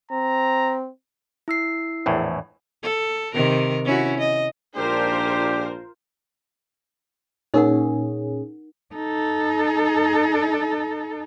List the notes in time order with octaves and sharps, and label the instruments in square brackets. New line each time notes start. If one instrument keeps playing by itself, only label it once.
[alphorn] C4 [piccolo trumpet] A#5
[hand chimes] E4 E6 C7
[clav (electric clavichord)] A#1 E2 A2
[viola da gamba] A4
C3 D#3 A#4
C#4 E4 F#4
D#5
[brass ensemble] A#1 G#2 D4 [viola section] F4 A#4 C5 [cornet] G4
[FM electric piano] A#2 C#4 G#4 [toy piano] D#4 A#4 F#5
[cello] D#4 A4